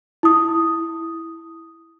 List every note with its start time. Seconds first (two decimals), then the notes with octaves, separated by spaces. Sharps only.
0.23 E4 D#6